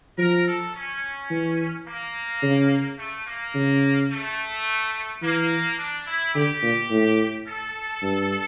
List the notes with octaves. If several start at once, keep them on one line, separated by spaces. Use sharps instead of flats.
F3 A#4
A4
C#4
E3
A#3
C#3
A3
A#3
C#3
A3
E3 A#3
D4
E4
D3 G4
A#2
A2
A4
G2